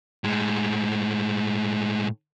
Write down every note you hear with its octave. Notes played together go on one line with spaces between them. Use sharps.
A2 G#3